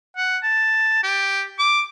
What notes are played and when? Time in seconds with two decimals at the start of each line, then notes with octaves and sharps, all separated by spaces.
0.17 F#5
0.43 A5
1.03 G4
1.59 D6